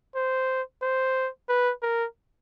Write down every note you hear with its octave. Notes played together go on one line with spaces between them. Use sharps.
C5
C5
B4
A#4